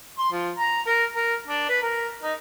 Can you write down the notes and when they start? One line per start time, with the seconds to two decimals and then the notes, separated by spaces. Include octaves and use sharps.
0.18 C6
0.32 F3
0.58 A#5
0.86 A#4
1.15 A#4
1.47 D4
1.69 B4
1.82 A#4
2.23 D#4